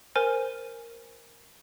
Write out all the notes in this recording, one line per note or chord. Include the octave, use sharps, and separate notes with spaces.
A#4 C5 G#5 F6